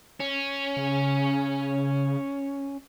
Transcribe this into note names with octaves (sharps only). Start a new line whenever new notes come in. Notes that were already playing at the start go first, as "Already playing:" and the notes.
C#4
C#3